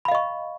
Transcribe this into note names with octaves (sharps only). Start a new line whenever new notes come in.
D#5 F5 B5 C#6